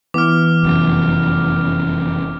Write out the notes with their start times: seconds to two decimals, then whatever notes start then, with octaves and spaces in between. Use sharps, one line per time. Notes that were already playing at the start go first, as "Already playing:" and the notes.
0.14 E3 B3 D6 F6
0.63 F1 F#2